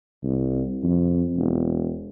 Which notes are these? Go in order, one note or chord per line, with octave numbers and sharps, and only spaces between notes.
C2
F2
E1